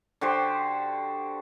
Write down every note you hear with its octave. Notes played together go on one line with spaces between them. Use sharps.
D3 F#4 G4 C5